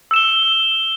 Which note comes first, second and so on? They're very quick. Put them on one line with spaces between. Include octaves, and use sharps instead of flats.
E6 E7 G7